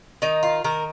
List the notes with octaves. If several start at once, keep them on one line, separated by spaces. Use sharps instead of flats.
D#3 D#4
F4
D#3 A#4